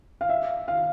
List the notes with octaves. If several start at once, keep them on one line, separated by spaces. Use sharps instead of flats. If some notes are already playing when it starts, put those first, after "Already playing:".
F5
E5
F5